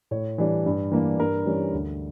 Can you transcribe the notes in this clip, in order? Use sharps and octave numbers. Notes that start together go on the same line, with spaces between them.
A2 C#5
E3 G3 D4
G2
E3 A#3 D4
G2 A#4
E3 G3 C#4
D2